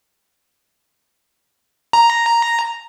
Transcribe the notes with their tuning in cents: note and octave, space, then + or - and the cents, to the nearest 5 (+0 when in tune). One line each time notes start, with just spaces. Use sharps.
A#5 +0